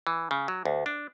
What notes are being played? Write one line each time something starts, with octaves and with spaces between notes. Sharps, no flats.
E3
C#3
F#3
D2
D4